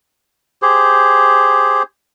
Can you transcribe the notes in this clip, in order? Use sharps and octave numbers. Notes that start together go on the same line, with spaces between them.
G4 G#4 C5